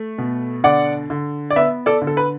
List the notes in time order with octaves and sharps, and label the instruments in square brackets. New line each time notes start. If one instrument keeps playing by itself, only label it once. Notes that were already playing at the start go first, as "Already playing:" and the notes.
Already playing: [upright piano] A3
B2
D3 D5 F#5
D3
D5
B3 B4 E5
A4 D5
D3
A4
B4